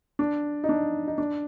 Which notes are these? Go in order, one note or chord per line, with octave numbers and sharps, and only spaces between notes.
D4
D#4
D4
D#4
D4